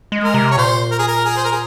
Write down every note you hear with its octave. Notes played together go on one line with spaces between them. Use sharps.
G#3
A#4
C3
C#5
A#2 C5
A#4
G#4
A#4
G#4
C5
A#4
G#4